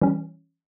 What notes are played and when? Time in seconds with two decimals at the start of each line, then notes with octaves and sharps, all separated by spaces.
0.01 E3 G3 C#4